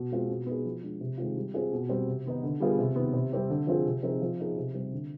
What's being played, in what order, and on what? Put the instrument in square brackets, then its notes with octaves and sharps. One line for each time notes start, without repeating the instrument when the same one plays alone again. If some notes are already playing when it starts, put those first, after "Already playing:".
Already playing: [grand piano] B2
G#3 C4 F4
B2
B3 D#4 G#4
F3
G#3 D4
C3
D#3 G#3 C4 F4
G3
C4 F4 G#4
B2
G3 C4
C3
D#3 B3 D#4
D3
G3 B3 F4 G#4
C3
D#3 B3
C3
G3 C4 G4
D3
F3 C4 F4 G#4
C3
F3 C4 D#4 G#4
F3
B3 D#4 G#4
C3
G3 C4
D3